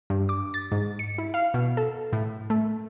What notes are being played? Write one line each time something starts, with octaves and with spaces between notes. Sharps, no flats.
G2
D6
A6
G#2
C#7
E4
F5
B2
A4
A2
A3